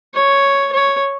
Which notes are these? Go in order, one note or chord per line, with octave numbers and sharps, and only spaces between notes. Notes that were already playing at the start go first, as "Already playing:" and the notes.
C#5
C#5